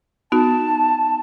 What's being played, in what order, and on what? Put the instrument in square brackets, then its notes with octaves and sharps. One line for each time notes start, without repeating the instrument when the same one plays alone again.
[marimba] B3 D#4 F#4 [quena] A5